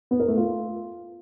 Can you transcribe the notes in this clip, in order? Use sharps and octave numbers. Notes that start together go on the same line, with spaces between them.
B3
A#4
A3
F4